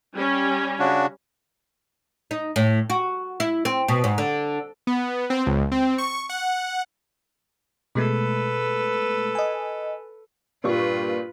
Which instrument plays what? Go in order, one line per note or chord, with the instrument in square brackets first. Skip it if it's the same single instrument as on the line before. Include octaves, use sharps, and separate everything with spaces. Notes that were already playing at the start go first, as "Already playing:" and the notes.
[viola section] G3 C#4
[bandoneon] C#3 D4 F#4
[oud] D#4
A2
F#4
E4
C4
B2
G#2
D3
[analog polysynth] B3
C4
C#2
C4
C#6
F#5
[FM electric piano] B2 G#3 A3 [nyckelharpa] A4 B4
[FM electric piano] D#5 G#5
[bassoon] G2 [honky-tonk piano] A#2 G3 C#6 [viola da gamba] F4 B4